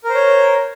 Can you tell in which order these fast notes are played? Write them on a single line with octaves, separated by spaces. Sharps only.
A#4 C5 C#5